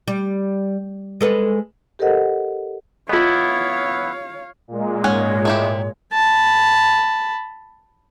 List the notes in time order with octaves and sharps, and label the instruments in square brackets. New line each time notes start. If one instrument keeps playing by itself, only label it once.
[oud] G3
G#3 A4 B4
[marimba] G4 A4 A#4 C5 D#5 F#5
[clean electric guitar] B3 E4 [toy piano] F4 D#5 [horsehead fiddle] C#5 F5
[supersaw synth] A#2 G#3
[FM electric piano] G#2 [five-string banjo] C#4 F#5 G#5 [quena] C#5
[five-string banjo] A3 E4 G4
[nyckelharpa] A5 B5